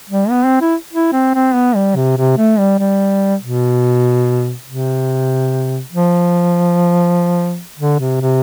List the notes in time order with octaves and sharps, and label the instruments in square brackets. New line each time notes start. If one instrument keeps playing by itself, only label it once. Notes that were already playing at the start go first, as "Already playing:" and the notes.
[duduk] G3
B3
C4
E4
E4
C4
C4
B3
G3
C3
C3
A3
G3
G3
B2
C3
F3
D3
C3
C3